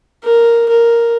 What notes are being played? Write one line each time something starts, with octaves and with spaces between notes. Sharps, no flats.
A#4
A#4